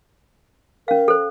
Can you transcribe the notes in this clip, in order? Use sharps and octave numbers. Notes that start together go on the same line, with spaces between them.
C#4 A#4 F5
A4 C5